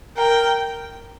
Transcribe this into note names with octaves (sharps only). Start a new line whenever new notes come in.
A#4 G5